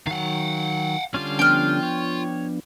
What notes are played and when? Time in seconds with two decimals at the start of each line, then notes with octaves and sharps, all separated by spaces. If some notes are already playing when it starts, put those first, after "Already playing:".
0.07 D#3 F#3 F5 F#5
1.14 D3 G3 C#4 F4
1.39 F3 B3 D4 G5 F6
1.83 C#5